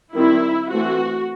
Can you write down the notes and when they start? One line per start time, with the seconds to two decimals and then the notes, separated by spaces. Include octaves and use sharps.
0.15 D#3 G3 C4 E4
0.70 E3 A3 C4 F#4